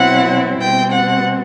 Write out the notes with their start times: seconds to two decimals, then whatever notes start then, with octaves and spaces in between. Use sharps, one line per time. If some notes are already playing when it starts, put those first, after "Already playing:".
Already playing: B2 F#3 C4 E4 F#5
0.61 B2 G3 C4 G5
0.92 F#5